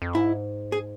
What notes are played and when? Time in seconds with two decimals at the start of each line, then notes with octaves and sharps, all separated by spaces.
0.02 F2
0.15 G#2 E4
0.72 G#4